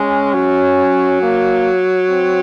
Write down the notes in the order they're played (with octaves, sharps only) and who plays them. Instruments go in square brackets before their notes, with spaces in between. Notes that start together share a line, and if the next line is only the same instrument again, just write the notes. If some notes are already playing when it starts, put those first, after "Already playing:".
Already playing: [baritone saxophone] G#3 [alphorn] C#4
[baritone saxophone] F#3
[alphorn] A#3
C4